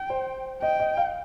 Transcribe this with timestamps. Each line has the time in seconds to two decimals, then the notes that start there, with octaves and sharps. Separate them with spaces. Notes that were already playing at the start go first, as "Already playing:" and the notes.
Already playing: G5
0.10 C5
0.62 D#5 G5
0.80 D#5
0.97 F5